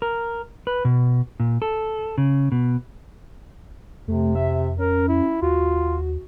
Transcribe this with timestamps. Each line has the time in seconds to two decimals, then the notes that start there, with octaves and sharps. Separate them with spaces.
0.02 A#4
0.67 B4
0.85 B2
1.40 A#2
1.62 A4
2.18 C#3
2.52 B2
4.08 F2 C3 A3
4.35 E5
4.79 C#4 A#4
5.09 E4
5.42 D#2 F4 F#4